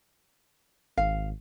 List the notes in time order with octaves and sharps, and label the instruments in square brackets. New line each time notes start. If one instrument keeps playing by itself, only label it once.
[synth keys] G#1 [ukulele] F5